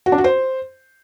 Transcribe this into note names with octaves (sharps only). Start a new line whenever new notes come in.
F#4
D4
F#4
C5